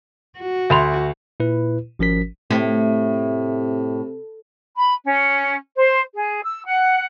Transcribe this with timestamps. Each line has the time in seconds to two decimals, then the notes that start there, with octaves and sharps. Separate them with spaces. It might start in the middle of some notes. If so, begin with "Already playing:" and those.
0.39 F#4
0.70 D2 E5 B5 C6
1.40 A#2 E4 B4
1.99 G#1 F3 C#4 A#4 B6
2.50 A2 C3
4.75 B5
5.04 C#4
5.76 C5
6.14 G#4
6.44 E6
6.65 F#5